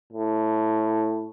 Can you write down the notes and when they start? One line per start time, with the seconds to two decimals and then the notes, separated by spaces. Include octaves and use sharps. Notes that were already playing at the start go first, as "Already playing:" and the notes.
0.13 A2